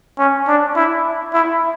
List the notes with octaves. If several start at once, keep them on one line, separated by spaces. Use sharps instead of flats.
C#4
D4
E4
E4